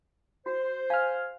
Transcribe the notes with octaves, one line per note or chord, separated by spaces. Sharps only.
F#4 C5
F5 G#5 F6